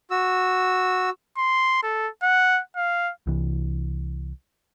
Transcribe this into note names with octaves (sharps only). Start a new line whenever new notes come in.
F#4 E6
C6
A4
F#5
F5
C2 E3